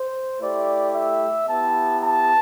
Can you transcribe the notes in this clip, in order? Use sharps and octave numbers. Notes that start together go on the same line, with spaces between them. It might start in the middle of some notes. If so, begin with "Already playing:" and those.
Already playing: C5
A3 E4 G4 D5
E5
B3 E4 G4 A5
A5